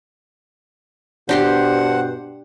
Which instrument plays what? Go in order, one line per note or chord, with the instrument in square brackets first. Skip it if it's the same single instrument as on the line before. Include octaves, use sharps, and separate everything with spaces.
[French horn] G2 [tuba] B2 [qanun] D4 G4 C6 [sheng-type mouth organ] C5 F#5